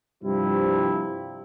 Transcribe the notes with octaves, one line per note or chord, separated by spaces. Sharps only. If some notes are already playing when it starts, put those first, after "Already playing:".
G2 C3 F3 G3 E4